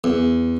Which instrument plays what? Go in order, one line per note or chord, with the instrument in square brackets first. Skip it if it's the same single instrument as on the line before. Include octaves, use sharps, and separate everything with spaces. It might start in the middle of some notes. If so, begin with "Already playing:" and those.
[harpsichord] E2